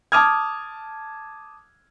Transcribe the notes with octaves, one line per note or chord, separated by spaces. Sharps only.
A5 D6 D#6 F6 G#6